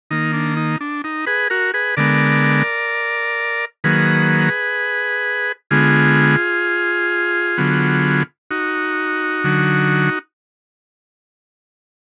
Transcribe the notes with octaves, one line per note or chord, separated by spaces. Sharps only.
D#3 A#3 D#4
D4
D#4
D4
D#4
G#4 B4
F#4 A#4
G#4 B4
D3 G#3 B3 A#4 D5
D#3 F#3 A#3 G#4 B4
D3 G#3 B3 F4 G#4
D3 F#3 B3
D#4 F#4
D3 F#3